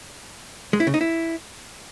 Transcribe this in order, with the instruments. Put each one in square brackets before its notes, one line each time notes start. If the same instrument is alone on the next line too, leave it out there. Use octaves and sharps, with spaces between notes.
[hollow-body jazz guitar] G#3
E4
C#3
D#4
E4